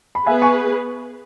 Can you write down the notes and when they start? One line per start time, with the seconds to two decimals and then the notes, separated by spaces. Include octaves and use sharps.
0.15 B5
0.26 B3 G#4 B4 E5 G#5
0.42 G#5 C#6